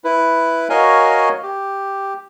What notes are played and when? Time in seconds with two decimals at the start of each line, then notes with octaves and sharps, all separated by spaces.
0.04 E4 B4
0.70 F#4 A#4 C#5 D#5 F5 G#5
1.43 G4